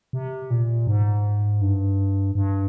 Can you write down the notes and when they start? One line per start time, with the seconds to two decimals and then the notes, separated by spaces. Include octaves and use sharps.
0.13 C3
0.50 A#2
0.87 G#2
1.61 G2
2.35 G2